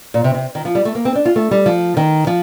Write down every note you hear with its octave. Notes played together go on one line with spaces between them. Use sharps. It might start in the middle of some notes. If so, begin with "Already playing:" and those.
A#2
C3
C3
D#3
F3
G3
A3
A#3
C4
D4
F4
A3
G3
F3
D#3
F3